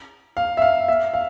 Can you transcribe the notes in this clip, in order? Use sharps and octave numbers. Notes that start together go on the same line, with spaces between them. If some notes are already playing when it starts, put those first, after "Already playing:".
F5
E5
F5
E5
F5